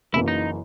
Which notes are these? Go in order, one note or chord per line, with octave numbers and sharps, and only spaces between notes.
F#1 F#2 E3 A#3 E4
D#4